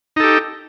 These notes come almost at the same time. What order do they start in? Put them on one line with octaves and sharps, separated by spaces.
D#4 A4 G4